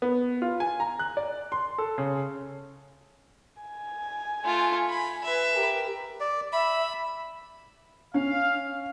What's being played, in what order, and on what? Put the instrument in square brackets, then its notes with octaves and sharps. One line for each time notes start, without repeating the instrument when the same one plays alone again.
[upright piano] B3
F4
G#5
A#5
F#6
D5
C6
A4
C#3
[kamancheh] G#5
[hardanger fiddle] A3 F4
B5
B4 E5
[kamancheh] G4 A#4
[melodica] D5
[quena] E5 [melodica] B5
[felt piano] C#4 [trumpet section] F5